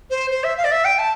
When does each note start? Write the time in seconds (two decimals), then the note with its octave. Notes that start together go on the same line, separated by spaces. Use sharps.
0.10 C5
0.30 C5
0.43 E5
0.57 F5
0.64 D5
0.71 E5
0.84 G5
0.98 A5